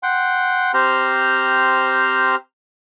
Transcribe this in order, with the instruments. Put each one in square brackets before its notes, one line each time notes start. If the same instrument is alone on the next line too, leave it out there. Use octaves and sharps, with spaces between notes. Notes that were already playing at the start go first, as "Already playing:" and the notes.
[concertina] F#5 G5 C6
C4 G4 C5 A#5 C6 F6